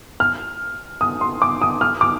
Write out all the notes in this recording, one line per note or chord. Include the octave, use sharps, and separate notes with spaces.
F6
D#6
C6
D6
D#6
F6
D6